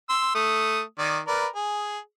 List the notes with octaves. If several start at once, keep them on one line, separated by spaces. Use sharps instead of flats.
C6 E6
A3 D#6
D#3 D5
A#4 B4 D5
G#4